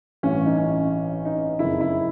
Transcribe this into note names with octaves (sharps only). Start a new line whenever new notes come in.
A1 G2 E3 C#4
D#4
C#4
D#4
F#1 F2 C#3 E4
D#4
E4